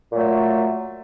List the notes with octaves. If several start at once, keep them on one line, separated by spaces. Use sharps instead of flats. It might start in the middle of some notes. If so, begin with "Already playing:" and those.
A#2 F#3 A3